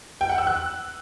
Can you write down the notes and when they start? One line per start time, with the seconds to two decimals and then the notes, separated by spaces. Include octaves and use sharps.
0.21 G5
0.29 F#5
0.38 E6
0.47 F#6